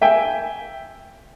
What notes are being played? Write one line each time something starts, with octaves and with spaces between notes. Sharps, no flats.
E5 G5 G#5